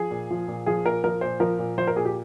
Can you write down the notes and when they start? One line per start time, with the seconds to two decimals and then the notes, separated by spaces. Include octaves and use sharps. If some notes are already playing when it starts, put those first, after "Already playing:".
Already playing: F3 G#4
0.11 A#2
0.30 F3
0.48 A#2
0.66 F3 G#4
0.85 A#2 A#4
1.04 F3 A#4
1.21 A#2 C5
1.40 F3 A#4
1.59 A#2
1.78 F3 C5
1.87 A#4
1.96 A#2 G#4
2.05 G4